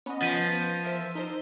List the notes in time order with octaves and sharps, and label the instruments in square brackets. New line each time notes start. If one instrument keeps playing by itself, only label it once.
[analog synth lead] B3 [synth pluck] C#4 D#5
[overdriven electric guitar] F3 [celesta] B6 D#7
[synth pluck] A#4 C5 [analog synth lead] E5
[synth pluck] D#4 A#4 C5 [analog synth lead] G6